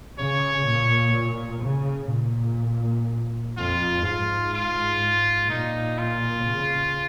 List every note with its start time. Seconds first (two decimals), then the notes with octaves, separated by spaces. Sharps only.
0.19 C#3 C#5
0.66 A#2
1.64 C#3
2.12 A#2
3.57 F2 F4
4.05 G#2 F4
4.54 F4
5.50 A#2 D#4
5.98 F4
6.48 C#3